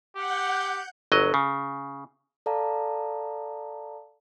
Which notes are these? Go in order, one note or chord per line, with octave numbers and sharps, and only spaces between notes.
G4 F#5 G6
G1 F#3 D#5
C#3
A4 D5 F5 A5 A#5